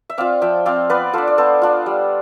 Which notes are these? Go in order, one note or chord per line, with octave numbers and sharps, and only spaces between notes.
E5
C4 F4 D5 F5
F3 E5 G5
C4 F4 D5 F5
B3 B4 D5
D4 F4 A4 C5
D5
B3 A4 C5
D4 F4
G3